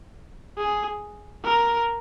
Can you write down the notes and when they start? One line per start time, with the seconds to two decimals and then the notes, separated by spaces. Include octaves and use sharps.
0.58 G#4
1.44 A#4